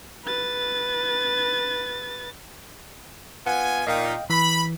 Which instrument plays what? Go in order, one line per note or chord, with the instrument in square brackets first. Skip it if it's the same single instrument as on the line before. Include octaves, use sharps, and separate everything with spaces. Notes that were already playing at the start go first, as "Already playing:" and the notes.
[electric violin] B4 A6
[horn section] B3 F4 G#5 [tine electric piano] F#5
[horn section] A#2 D#4 [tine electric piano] D#5 F5 G5
[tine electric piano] E3 [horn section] B5